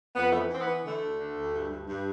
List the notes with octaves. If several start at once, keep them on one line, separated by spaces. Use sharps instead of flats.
F2 B3
E3 A3
B3
E3 C4
B3
E3
D3 A3
D2
D3
D2
G2
G2
G2